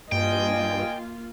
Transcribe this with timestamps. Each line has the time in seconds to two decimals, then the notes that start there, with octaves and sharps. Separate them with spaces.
0.12 G2 A#3 F4 D#5 G5 G#5